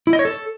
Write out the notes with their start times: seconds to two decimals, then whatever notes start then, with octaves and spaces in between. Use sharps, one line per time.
0.07 E4
0.13 D#5
0.19 C#5
0.25 A4